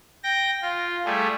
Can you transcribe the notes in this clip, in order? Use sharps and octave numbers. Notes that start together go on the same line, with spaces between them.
G5 A#6
F4
G3 A3 G#4